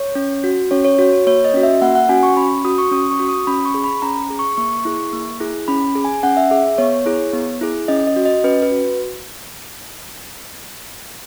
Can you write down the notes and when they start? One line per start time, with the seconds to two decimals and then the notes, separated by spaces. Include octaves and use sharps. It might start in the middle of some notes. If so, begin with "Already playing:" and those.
Already playing: C#5
0.15 C#4
0.44 F#4
0.71 C#4 C#5
0.85 C#5
0.99 F#4 C#5
1.13 C#5
1.27 A#3 C#5
1.45 D#5
1.53 C#4 F#4
1.63 E5
1.82 A#3 F#5
1.95 F#5
2.09 C#4 F#4 G#5
2.23 C#6
2.37 C#4 B5
2.65 F#4 D#6
2.78 C#6
2.91 C#4 D#6
3.11 C#6
3.20 F#4
3.29 D#6
3.47 C#4 B5
3.65 C#6
3.74 G#4
3.84 B5
4.02 C#4 A#5
4.30 G#4
4.39 C#6
4.57 A#3 C#6
4.85 E4 G#4
5.13 A#3
5.40 E4 G#4
5.68 C#4 B5
5.95 G#4
6.05 G#5
6.23 C#4 F#5
6.37 E5
6.50 G#4 E5
6.78 B3 C#5
7.06 E4 G#4
7.33 B3
7.61 E4 G#4
7.88 C#4 D#5
8.07 D#5
8.16 F#4
8.25 D#5
8.44 C#4 B4
8.63 B4
8.71 F#4